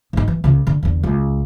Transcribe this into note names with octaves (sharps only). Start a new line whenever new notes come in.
G#2 D#4
E3
C#2 C#3
D3
E2 D3
C#2